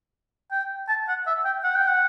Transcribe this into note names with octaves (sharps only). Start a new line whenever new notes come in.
G5
A5
F#5
E5
G5
F#5
G5
F#5